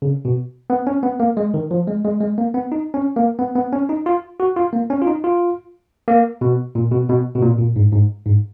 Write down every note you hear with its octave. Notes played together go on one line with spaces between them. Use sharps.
C#3
B2
B3
C#4
B3
A#3
G#3
D#3
F3
G#3
G#3
G#3
A#3
B3
D#4
C#4
A#3
B3
B3
C#4
D#4
F4
F#4
F4
A#3
C#4
F4
D#4
F4
A#3
B2
A#2
B2
B2
B2
A#2
A#2
G#2
G#2
G#2